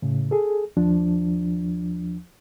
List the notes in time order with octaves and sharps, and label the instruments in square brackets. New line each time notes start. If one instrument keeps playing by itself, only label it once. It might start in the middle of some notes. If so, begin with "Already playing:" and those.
[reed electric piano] A2 C#3
G#4 A4
D#2 F3 D4